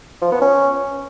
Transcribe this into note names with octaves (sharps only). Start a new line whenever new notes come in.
F3
B3
C#4